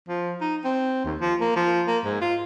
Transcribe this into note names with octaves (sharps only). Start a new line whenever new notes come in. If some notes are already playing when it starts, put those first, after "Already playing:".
F3
D#4
C4
D#2
F3
A#3
F3
A#3
G#2
F4